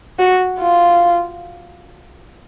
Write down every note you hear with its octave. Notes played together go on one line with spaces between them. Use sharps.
F#4
F4